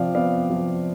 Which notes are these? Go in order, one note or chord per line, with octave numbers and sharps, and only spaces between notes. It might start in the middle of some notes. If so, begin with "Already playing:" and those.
Already playing: C3 F3 D5 F5 G5
B3 D5 F5
F3